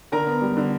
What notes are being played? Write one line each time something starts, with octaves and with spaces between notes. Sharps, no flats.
D3 A#4 A#5
B3
G3
D3